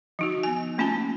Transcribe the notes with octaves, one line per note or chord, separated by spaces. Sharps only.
F3 D#4 F#4
B3 G#5
A3 A#3 C#4 F4 G#5 A5